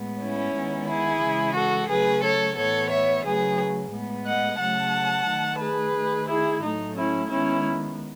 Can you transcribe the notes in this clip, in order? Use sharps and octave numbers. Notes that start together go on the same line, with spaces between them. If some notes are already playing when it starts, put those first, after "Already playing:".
Already playing: A2 G#3 B3
C#4 E4
D#3 G#3 B3
E4 G#4
C#3 E3 G#3
F#4 A4
C#3 F#3 A3 G#4 B4
A4 C#5
A2 E3 B3 A4 C#5
C#5 E5
C#3 F#3 A3 G#4 B4
A2 G#3 B3
D#5 F#5
C#3 F#3 A3 F#5 A5
D#3 A3
G#4 B4
D#3 A3
E4 G#4
A2 F#3 A3 D#4
C#4 E4
D#3 G#3 B3 C#4 E4